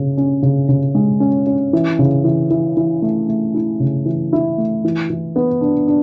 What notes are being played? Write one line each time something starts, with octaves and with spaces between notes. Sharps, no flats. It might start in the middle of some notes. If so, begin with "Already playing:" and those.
Already playing: C#3 C#4
C#4
C#3
C#3
G#3
C#4
C#4
E3
C#3
E3
E3
E3
A3
A3
E4
C#3
E3
E4
A3
E3
E3
B3
D4
D4